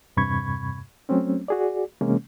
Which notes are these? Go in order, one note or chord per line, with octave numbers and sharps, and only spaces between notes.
E2 G2 C3 B5 C#6 G#6
F#3 A3 C4 C#4
F#4 G#4 D5
C3 E3 G#3 A#3 C#4